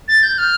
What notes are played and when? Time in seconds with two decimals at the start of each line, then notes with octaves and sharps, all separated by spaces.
0.08 A6
0.23 G6
0.38 F6